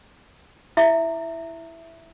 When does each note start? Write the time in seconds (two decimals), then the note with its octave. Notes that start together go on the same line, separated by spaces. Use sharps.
0.77 E4 E5